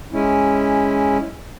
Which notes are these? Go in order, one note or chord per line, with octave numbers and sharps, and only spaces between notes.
G#3 C#4 E4